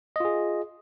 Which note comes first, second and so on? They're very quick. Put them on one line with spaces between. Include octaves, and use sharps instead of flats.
D#5 F4 G#4